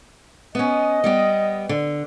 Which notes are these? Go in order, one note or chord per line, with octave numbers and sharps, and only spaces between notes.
B3 C#4 D#5
G3 B3 G4
D3